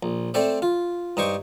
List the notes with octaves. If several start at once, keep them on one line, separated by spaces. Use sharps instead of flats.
A#1
A3 C4 A4 C5 D5
F4
G2 D#4 C5 C#6 D6